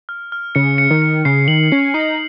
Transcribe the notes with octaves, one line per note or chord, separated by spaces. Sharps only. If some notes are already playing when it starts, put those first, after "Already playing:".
F6
F6
C#3 C#7
C#7
D#3
C#7
C#3 C7
D#3 F#7
C#4 C7
D#4 C7